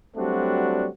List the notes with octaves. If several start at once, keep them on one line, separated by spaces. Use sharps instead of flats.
F#3 G3 A3 C4 D4 F#4